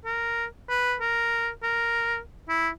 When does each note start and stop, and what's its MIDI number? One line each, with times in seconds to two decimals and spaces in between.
0.05 0.45 70
0.69 0.95 71
1.00 1.49 70
1.63 2.18 70
2.49 2.69 64